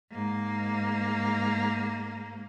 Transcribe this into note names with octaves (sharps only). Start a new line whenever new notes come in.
G#2 A#3